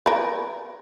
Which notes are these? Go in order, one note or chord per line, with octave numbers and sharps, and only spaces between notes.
A#4 B4